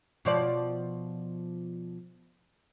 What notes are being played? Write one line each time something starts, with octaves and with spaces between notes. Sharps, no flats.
B2 F3 D5